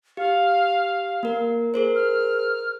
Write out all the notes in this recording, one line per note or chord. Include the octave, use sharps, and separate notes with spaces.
G4 F5
A#3 A#4
G#4 A#4 C5
F6